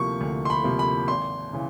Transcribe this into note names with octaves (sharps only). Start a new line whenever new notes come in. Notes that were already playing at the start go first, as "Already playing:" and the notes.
Already playing: D2 C3 F3 A#3 C#6
D2
C6
B5
C3 F3 A#3
B5
G#1 C6
C#3 E3